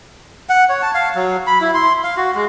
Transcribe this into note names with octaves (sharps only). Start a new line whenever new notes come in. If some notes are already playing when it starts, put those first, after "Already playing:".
F#5
C#5
A5
F5
F#3
B5
E4
C6
F5
F#4
G#3